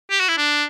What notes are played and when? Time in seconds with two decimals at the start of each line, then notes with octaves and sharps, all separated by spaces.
0.11 G4
0.20 F#4
0.29 E4
0.37 D4